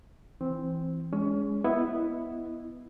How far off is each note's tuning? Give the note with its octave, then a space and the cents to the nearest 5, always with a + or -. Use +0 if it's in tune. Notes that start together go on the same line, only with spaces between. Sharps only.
E3 +10 C4 +0
G#3 +0 C#4 +30
B3 +0 E4 +0 D#5 +0